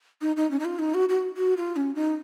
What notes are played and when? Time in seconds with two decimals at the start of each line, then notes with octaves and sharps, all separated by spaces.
0.21 D#4
0.36 D#4
0.51 C#4
0.59 D#4
0.65 F4
0.79 D#4
0.94 F#4
1.09 F#4
1.37 F#4
1.57 F4
1.76 C#4
1.95 D#4